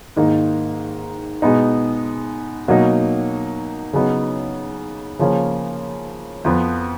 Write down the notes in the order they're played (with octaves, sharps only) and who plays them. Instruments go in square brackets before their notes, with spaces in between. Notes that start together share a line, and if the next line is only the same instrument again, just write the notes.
[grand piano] G#2 D#3 A#3 D#4
B2 G#3 B3 D#4
B2 F#3 A#3 D#4
C#3 F#3 B3 D#4
C#3 F3 A#3 C#4
F2 F3 B3